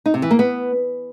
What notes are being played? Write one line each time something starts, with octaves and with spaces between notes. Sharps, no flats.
D#4
C3
E3
A#3
B3